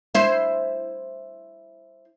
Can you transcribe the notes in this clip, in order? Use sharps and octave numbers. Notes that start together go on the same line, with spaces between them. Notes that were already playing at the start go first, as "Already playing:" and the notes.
E4 C5